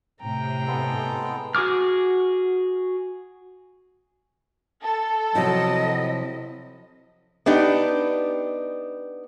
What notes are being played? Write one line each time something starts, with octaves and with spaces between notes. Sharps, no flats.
A2 C3 G5 A#5
G#3 B3 A4
F#4 G#4 D6 F6
A4
C3 F3 F#3 E4 D#5
B3 D4 D#4 G4